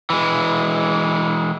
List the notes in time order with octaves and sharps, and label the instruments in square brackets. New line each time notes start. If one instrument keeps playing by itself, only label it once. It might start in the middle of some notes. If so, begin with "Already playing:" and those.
[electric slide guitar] E3 G#3